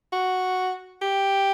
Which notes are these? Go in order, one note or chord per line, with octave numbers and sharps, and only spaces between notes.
F#4
G4